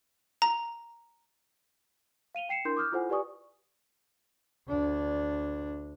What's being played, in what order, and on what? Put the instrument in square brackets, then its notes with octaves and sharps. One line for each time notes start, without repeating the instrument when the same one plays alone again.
[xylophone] A#5
[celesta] F5 D#7 F7 G7
G5 C7 C#7 E7
D4 E4 A#4 C6 G6
D6 D#6 F6 G6
E4 F4 A4 C5 F#5 G#5
G4 B4 D5 G#5 C#6 D#6
[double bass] D2 D4